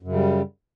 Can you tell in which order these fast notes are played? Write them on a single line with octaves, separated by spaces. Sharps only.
F#2 C#3 G3